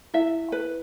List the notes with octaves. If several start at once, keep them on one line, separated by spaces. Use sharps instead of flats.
E4 E5
B4